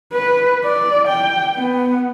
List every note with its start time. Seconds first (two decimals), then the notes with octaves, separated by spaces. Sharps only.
0.13 B4
0.65 D5
1.08 G5
1.56 B3